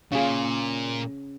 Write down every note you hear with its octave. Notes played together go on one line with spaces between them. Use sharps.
A#2 C#3 G#4